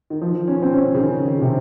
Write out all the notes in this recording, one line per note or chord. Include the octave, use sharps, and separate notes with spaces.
D#3
F3
C#4
C4
C#4
C#3
D#3
D#3
C3